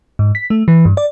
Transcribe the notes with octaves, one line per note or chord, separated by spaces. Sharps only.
G#2
B6
A3
E3
G2
D5